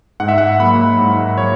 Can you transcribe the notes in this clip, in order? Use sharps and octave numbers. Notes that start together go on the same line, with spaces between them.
G#2 F#5
E5
F#5
F#3 A#3 B5
G#2
F#3 C#5